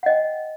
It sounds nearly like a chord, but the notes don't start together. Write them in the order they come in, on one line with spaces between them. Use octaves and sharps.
F#5 D#5 G5